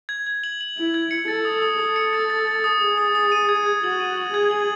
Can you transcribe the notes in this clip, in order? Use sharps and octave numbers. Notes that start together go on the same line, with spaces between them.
G#6
G#6
F#7
F#7
E4 F#7
G#6
C#7
A4 A6
D#6
D#6
A4 D#6
C#7
A6
A6
A6
D#6
G#4 D#6
D#6
D#6
D#7
G#6
G#6
F#4 F#7
D#7
F#7
G#4 G#6
F#7